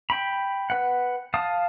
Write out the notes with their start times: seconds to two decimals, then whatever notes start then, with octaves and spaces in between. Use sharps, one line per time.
0.10 G5 B5
0.70 B4 F#5
1.34 F5 A5 D#6